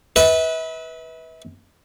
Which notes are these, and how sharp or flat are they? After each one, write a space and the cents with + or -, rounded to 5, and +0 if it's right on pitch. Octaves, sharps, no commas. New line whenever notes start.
B4 -5 E5 -40